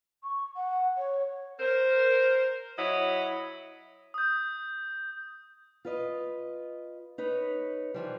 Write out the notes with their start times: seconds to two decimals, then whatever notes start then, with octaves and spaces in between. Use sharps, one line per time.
0.23 C#6
0.56 F#5
0.98 C#5
1.60 A#4 C5
2.78 F#3 E4 C#5 D#5
4.14 D#6 G6
5.85 F4 B4 D#5
7.18 D#4 B4 C#5
7.94 E3 F3 G3